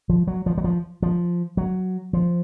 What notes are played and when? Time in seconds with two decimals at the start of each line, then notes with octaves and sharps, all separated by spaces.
0.09 F3
0.27 F#3
0.46 F3
0.58 F#3
0.64 F3
1.02 F3
1.57 F#3
2.13 F3